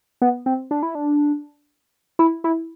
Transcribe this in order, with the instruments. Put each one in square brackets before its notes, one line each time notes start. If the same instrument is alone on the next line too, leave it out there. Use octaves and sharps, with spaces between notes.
[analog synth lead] B3
C4
D4
E4
D4
E4
E4